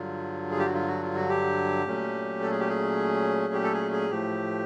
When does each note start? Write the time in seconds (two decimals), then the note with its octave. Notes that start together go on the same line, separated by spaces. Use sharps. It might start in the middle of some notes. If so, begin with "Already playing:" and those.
Already playing: G2 D3 F#3 F4
0.51 G#4
0.59 G4
0.66 F#4
0.74 F4
0.87 F#4
1.02 F4
1.16 F#4
1.29 G4
1.86 A#2 F#3 A3 C#4
2.42 A4
2.51 G#4
2.60 G4
2.69 G#4
3.54 G4
3.63 A4
3.73 G#4
3.92 G#4
4.10 A2 F3 A3 G4